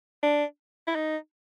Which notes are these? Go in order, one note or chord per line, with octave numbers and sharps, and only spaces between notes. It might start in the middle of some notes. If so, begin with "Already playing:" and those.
D4
E4
D#4